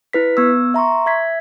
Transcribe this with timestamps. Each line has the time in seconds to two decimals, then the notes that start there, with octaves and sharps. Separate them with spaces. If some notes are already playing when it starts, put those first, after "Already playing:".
0.13 E4 B4 B6
0.37 B3 E6
0.74 E5 A#5 C6 C#6
1.06 E5 G#6 B6